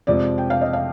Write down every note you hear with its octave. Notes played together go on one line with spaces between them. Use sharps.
F2 C3 F3 G#3 D5
G5
F5
D#5
F5